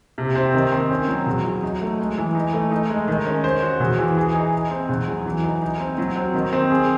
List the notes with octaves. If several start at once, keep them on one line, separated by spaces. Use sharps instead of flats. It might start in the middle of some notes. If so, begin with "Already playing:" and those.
C3
C4
D#3
C4
C#4
F#3
E2
F#3
D#4
A3
G#3
E3
D#4
A3
D#4
G#3
D#3
C#4
C5
F#4
E2
E3
G#4
D#4
D#4
C4
E2
F#3
E3
D#4
D#4
C4
F#3
C4
D#3
C4
G#4